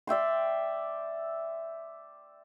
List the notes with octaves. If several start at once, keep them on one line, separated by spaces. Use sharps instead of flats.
D5 E5 G5 C6